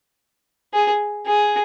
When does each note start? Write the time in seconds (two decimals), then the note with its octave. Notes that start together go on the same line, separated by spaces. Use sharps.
0.74 G#4
1.27 G#4